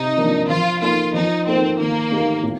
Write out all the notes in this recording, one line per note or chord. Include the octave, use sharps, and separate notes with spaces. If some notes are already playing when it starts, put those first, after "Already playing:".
Already playing: C3 D#4
F3 A#3 D4
F3 F4
A#3 D#4 F4 A4
F3 D#4
A#3 C4 D#4 A4 C5
D#3 A#3
A3 D#4 G4 A#4
A2